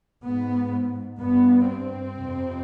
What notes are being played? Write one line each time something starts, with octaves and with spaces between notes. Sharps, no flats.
G#2 B3
G2 B3
C4
F2 C3